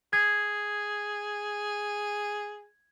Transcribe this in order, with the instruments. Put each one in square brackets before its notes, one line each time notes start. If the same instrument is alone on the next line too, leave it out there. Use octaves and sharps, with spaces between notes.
[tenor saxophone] G#4 [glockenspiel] G#6